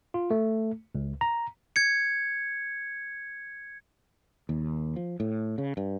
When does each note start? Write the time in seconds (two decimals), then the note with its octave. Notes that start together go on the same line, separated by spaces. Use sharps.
0.14 F4
0.31 A3
0.95 C#2
1.21 A#5
1.76 G#6 C#7
4.49 D#2
4.96 F3
5.20 A2
5.58 C#3
5.77 G2